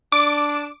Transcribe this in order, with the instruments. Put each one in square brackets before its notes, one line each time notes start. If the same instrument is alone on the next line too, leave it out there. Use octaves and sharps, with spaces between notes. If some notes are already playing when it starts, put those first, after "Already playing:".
[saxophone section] D4 [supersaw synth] D6